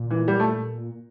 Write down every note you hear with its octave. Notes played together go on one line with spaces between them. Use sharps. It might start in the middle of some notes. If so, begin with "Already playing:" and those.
Already playing: A#2
E3
G3
A3